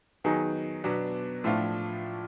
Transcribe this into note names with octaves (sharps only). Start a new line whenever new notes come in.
D#3 F#3 B3 D#4 G#4
B2 F#3 B3 D4
A2 F3 A3 D4 F4